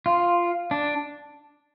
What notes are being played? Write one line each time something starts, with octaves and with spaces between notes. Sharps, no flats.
F4
D4